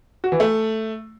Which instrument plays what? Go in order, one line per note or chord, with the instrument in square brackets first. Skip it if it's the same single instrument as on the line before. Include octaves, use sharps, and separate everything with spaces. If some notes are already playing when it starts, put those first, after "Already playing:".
[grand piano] F#4
E3
A3